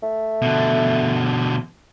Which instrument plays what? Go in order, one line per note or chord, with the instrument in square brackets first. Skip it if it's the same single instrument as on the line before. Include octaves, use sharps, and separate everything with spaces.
[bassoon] A3
[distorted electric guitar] B2 D3